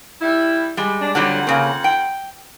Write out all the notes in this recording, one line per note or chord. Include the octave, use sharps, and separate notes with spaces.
G3 E4
G3 G#3
D4
F2 D3 F#3 G3 F#5
C#3 A#3
G5